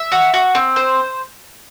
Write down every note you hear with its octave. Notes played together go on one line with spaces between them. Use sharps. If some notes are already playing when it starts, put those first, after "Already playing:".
Already playing: E5
F#4
F#4
C4
C5